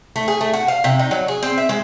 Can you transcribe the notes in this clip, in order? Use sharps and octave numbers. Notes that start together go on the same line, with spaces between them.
A3
G#4
A3
F#4
F5
C3
D#4
F#3
G#4
C4
E5
G#3